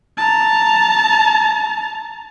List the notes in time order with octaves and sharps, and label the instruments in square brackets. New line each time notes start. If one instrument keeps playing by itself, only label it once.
[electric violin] A5 A#5